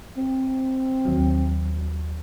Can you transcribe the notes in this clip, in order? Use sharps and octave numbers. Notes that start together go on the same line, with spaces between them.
C4
D#2 F#3